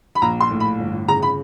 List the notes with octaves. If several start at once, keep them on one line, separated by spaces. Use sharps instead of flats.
B5
A#1 A#5
C6
A2
B5
G1
C#3 A#5
B5